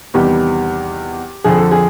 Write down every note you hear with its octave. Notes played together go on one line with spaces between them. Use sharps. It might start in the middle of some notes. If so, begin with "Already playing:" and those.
E2 C3 D#3 G3 B3 G4
F2 D3 F3 G#4
A4
G#4